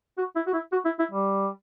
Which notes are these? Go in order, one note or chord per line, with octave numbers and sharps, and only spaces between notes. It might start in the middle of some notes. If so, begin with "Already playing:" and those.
F#4
E4
F#4
E4
F#4
E4
E4
G3